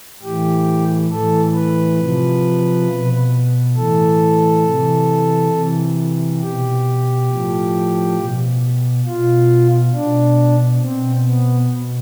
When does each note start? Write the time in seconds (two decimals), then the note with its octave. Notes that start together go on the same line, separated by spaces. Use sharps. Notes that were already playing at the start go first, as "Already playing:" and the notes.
0.22 A2 E3 G4
1.11 A2 E3 A4
1.54 B4
1.98 C3 F3
2.87 B2
3.75 A2 E3 A4
4.64 C3 E3
5.53 C3 E3
6.40 B2 G4
7.28 A2 F3
8.17 B2
9.05 B2 F4
9.93 B2 D4
10.81 B2 C4
11.26 B3
11.70 B2